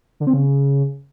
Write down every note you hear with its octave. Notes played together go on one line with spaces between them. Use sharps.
D3
C4
C#3